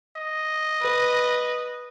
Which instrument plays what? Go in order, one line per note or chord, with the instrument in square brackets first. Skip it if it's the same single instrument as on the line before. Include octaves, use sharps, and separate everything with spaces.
[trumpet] D#5
[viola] B4